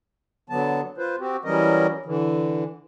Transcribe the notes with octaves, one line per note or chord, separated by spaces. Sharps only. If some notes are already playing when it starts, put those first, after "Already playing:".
D3 F#3 B3 A5
F4 B4 C5
C4 F#4 G4
E3 F#3 G3 C#4 A#4 D#5
D3 E3